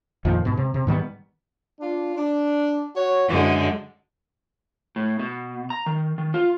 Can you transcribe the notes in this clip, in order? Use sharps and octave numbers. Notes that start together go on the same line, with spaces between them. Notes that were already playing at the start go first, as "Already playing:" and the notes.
F2 A#2 D#3 F3
G#2 B2
C3
C3
G#2 D#3 G3 B3
D4 F4
D4
F#4 C#5
F#2 D3 E3 G#3
A2
B2
A#5
D#3
D#3
F4